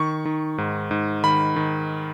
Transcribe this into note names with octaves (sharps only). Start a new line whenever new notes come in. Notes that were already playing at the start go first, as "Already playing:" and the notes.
Already playing: D#3 C#6
D#3
G#2
G#2
D#3 B5
D#3